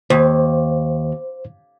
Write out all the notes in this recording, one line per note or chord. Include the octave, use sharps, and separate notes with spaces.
D#2 C5